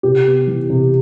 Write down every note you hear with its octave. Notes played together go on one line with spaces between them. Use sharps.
C3 G4
B3
E3
C3